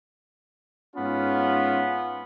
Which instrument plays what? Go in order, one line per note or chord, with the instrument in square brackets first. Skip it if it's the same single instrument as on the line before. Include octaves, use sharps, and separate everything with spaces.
[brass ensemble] G#2 C#4 F4 [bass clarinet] B3